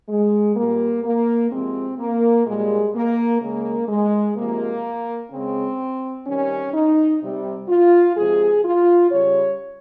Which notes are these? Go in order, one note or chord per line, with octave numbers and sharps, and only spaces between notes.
G#3
A#2 G3 A#3
A#3
C3 F3 G#3 C4
A#3
A#2 G3 G#3
A#3
C#3 G#3 A#3
G#3
C3 F3 G#3 A#3
C#3 G#3 C4
C3 D#3 G3 C#4
D#4
C3 G3
F4
C3 F3 G#3 G#4
F4
C#3 G3 C#5